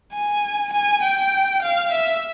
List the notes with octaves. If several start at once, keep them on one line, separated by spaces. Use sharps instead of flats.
G#5
G#5
G5
F5
E5